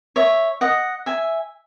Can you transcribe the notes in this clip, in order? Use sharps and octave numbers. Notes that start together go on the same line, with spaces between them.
C#5 E5
D#5 F#5
E5 G#5